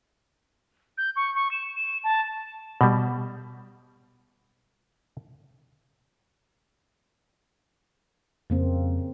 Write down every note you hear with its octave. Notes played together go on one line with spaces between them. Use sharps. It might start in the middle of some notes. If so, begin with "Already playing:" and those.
G6
C#6
C#6
E7
E7
A5
B2 G3
F2 C#3 A#3 C4